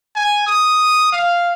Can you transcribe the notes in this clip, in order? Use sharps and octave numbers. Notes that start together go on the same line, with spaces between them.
G#5
D#6
F5